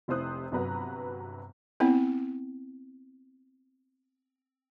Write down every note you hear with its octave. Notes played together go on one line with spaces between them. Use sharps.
F1 C3 E4 C5 D#6 F#6
G1 C3 F#3 B4 A#5
B3 C4 E4